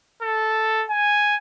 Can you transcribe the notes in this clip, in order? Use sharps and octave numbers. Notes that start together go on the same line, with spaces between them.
A4
G#5